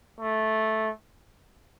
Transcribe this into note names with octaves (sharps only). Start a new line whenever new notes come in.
A3